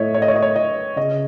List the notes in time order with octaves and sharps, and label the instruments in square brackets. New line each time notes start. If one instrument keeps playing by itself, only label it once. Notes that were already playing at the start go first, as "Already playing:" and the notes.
Already playing: [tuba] A2 [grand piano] C#5 D#5 E5
[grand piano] C#5
D#5
C#5
D#5
C#5
D#5
[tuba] C#3 [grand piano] D#5